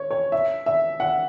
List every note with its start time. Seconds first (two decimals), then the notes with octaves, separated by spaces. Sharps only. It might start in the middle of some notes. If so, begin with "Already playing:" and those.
Already playing: C#5
0.11 C#5
0.32 E5
0.66 E5
1.00 F#5